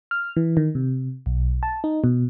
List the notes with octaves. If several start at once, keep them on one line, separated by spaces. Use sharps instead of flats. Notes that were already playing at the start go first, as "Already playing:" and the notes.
F6
E3
D#3
C3
B1
A5
D#4
B2